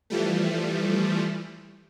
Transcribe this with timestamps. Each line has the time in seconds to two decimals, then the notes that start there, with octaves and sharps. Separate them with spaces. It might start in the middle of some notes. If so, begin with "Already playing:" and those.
0.10 E3 F3 G3 A3